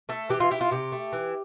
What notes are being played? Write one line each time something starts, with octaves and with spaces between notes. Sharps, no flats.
A3 A4
E3 G4
F4
E4 G4
F4
C3 G4
A3
E3